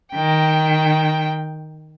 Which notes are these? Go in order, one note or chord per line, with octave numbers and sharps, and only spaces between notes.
D#3 G5